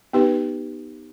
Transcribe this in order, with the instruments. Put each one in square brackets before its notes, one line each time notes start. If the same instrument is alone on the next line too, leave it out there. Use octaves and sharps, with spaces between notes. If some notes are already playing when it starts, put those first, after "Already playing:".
[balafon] B3 D#4 G4 B4